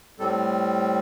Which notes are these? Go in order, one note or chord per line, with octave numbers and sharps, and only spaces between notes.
A2 G3 C4 A4